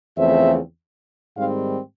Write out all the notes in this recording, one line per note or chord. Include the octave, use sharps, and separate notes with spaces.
E2 C#3 F3 A3 C4 E5
G#2 D#3 G3 C4 F5